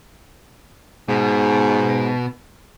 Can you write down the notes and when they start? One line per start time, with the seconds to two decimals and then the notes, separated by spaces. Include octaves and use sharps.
1.09 G#2 B2